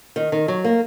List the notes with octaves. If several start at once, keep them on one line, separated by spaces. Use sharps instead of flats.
D#3
D#3
F#3
A#3